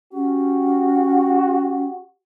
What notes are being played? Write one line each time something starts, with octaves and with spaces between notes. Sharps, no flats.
C#4 F#4 G4